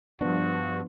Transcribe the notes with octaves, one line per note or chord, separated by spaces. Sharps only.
G2 F3 B3 D4 F#4